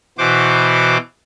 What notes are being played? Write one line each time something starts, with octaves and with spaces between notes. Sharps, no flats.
B2 E3 F#4 C5 D6